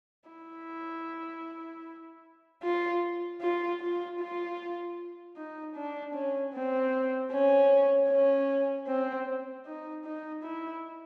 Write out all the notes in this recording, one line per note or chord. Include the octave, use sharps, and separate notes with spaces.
E4
F4
F4
F4
F4
D#4
D4
C#4
C4
C#4
C#4
C4
D#4
D#4
E4